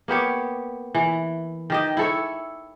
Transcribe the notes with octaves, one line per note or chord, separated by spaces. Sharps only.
A#3 B3 G4 C#5
E3
D#3 G4 D#5
E4 A4 C#5